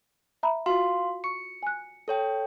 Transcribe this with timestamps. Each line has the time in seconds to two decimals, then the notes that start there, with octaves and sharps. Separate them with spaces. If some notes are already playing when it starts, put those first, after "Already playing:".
0.43 E5 A#5 B5
0.66 F4 F#4 F5 C6
1.24 C#6 C#7
1.63 G#5 F#6
2.08 A4 C#5 G5